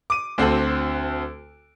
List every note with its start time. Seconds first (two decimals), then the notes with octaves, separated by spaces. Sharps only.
0.10 D6 D#7
0.38 D2 C4 F#4 A4 F#7